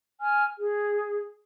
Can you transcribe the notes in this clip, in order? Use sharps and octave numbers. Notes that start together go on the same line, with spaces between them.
G#5 F6
G#4